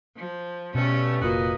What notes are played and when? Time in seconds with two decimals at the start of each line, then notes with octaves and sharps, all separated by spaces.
0.16 F3
0.75 G2 B2 A3 C#4
1.22 F1 A#2 A#3 F#4 B4 D#5